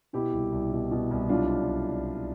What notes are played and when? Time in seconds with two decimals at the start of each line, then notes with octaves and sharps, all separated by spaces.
0.13 B2 E4 G4
0.32 C2
0.52 C2
0.72 B2
0.91 B2
1.11 C2
1.29 B1 D4 F4